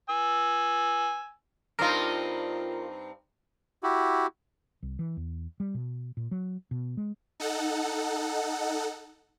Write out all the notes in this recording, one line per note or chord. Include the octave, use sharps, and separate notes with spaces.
G#5 E6
G2 C4 D#4 F4 A#4
E4 F#4 G4
C2
E3
E2
G3
B2
A#2
F#3
B2
G#3
D#4 A4 F#5